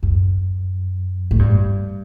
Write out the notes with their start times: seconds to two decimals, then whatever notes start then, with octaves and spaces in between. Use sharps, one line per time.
0.03 F#2
1.31 A2
1.39 G2